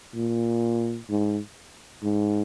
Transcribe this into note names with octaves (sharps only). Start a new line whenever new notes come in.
A#2
G#2
G#2